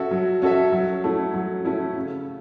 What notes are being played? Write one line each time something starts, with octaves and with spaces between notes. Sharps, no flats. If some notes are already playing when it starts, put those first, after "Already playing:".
Already playing: C#4 F#4 A4 E5
F#3
C#4 F#4 A4 E5
F#3
A3 C#4 E4
F#3
A3 C#4 E4
C#3